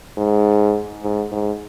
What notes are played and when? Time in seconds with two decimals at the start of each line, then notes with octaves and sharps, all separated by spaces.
0.17 G#2
1.03 G#2
1.32 G#2